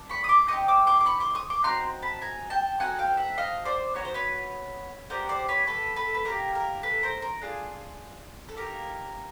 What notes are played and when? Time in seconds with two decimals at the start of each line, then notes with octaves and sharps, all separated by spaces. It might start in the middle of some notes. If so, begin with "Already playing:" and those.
Already playing: D4
0.09 B5 C#6
0.24 D#6
0.29 C6 D6
0.48 C4 D#4 G4 C#6 D#6
0.68 D6 E6
0.87 C6 D6
1.01 D6
1.06 B5 C#6
1.20 C6 D6
1.35 C#6 D#6
1.50 C6 D6
1.64 C4 D#4 F#4 A#5 C6
2.02 A5 B5
2.22 G#5 A#5
2.50 G5 A5
2.79 C4 D#4 F#4 A4 F#5 G#5
2.99 F5 G5
3.17 E5 F#5
3.38 D#5 F5
3.65 C5 D5
3.95 B3 D#4 F#4 C#5
4.05 C5
4.14 B4 C#5
5.10 B3 D4 G4 A#4 C5
5.29 C5 D5
5.48 B4 C#5
5.67 A4 B4
5.96 A4 B4
6.14 B4
6.25 A#3 D4 G4 A#4
6.55 A#4
6.83 A4 B4
7.03 A#4 C5
7.22 A#4
7.41 D4 F4 G#4
8.49 A4
8.57 A#3 D#4 G4 A#4